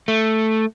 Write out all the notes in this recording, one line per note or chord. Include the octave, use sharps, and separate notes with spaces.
A3